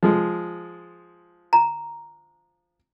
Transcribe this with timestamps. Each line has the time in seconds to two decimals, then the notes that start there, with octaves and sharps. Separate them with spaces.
0.03 F3 G#3
1.53 A#5